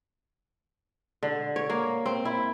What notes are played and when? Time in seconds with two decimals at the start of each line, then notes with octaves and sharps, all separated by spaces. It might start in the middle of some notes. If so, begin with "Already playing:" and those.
1.23 D3
1.56 C#5
1.70 A#3
2.06 C4
2.25 E4